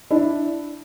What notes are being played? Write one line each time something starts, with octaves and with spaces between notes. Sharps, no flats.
D4 E4